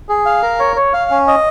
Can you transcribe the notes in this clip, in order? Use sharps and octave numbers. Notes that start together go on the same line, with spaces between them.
G#4
F5
A#4
C#5
C#5
F5
C#4
D#5